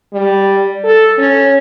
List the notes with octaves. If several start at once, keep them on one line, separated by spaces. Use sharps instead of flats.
G3
A4
C#4